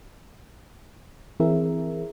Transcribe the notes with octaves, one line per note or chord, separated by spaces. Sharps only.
E3 C4 E4 G#4 A#4 E5